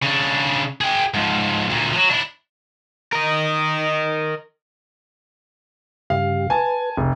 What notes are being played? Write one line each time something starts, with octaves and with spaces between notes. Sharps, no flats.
C#3 D4
G#4 G5
G#2 F3
D2 A#2
F3 F#3
D4 E4
A#4 D#5
G2 C#3 G4 F5
B4 G#5 A5
F1